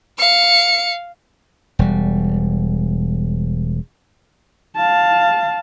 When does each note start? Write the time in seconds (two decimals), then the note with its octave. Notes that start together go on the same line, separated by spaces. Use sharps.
0.19 F5 C#7
1.79 E1 G3
4.77 F5 A5